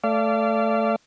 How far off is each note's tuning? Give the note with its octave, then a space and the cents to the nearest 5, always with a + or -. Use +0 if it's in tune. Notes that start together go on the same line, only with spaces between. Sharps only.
A3 +0 D5 -15 F5 -35